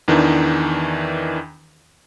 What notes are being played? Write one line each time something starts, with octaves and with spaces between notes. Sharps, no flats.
E2 D#3 E3 D4